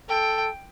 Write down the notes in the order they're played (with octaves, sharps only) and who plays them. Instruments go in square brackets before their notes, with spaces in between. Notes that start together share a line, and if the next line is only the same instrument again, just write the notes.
[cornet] A4 [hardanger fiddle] G5